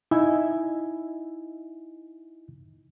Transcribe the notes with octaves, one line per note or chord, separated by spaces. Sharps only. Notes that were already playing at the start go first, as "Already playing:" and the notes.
D#4 E4 D#5 E5 G#5